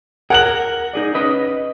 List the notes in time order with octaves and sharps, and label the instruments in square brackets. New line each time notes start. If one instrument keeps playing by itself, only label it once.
[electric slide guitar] G#4 A#4 [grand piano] F#5 F#6 F#7
[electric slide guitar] A#4
D#4 G#4 D5
C#4 B4 D#5